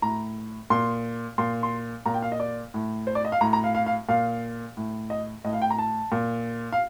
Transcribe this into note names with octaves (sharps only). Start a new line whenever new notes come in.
A2 A#5
A#2 C6
A#2 C6
C6
A#2 A#5
G5
F5
D#5
D5
A2
C5
D5
D#5
F5
A2 A#5
A#5
F5
F5
F5
A#2 F5
A2
D#5
A2 D#5
F5
G5
A#5
A5
A#2
F5